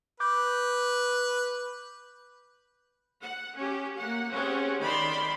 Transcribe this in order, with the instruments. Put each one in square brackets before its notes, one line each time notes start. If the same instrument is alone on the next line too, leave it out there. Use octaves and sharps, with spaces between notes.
[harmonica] B4 [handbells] D6 G6
[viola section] F#5
C#4 G4
A#3 F#5
C4 C#4 G4 G#4 C#5 F#5
D#3 D5 B5 C6